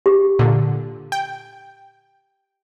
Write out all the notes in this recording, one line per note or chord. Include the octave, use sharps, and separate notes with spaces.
G4
A#2 D3
G5